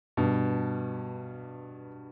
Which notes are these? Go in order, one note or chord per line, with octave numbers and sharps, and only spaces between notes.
G2 B2